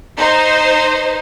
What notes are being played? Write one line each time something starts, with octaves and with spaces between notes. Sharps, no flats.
D#4 C5